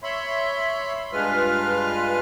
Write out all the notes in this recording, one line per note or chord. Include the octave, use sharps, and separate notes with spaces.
C#5 E5 B5 C6
G2 G#3 F4 B4 F6